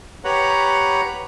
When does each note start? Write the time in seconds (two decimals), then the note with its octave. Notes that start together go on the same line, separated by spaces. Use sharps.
0.25 G4 B4 C#5 F#5 A#5 B5